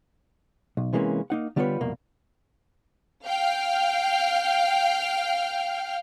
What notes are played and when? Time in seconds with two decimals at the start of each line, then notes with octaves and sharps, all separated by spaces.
0.77 B1
0.93 C3 E3 G#3 A#3 C#4
1.30 A#3 D#4 F#5
1.56 D3 G3 B3 F4 B4 C#5
1.81 C2 F2 B2 A#3
3.25 F5 G5 F6